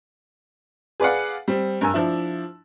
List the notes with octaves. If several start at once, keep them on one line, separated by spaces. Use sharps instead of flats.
G#4 B4 D5 F5 F#5
G3 C4
G2 A#4 G#5 E6
F3 D4 E4